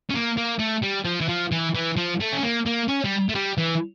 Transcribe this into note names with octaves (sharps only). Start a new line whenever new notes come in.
C#4
A#3
A#3
A3
G3
F3
E3
F3
E3
E3
F3
A3
C#4
A#3
A#3
C#4
G3
A3
G3
E3